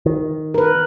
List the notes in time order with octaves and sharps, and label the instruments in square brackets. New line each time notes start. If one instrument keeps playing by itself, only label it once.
[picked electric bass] D#3
[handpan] A#4 B4